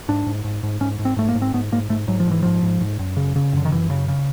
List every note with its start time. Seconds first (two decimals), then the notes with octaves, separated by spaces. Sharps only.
0.08 G#2 D4
0.26 G#2
0.44 G#2
0.63 G#2
0.80 G#2 C#4
0.99 G#2
1.05 C4
1.17 G#2 A3
1.29 A#3
1.35 G#2
1.42 C4
1.54 G#2 B3
1.72 G#2 A#3
1.90 G#2 A3
2.08 G#2 F#3
2.20 F3
2.26 G#2
2.31 E3
2.43 G#2 F3
2.62 G#2
2.81 G#2
2.99 F#2
3.17 C#3
3.36 C#3
3.53 F#2 D3
3.65 D#3
3.72 F#2 E3
3.90 C#3
4.08 C#3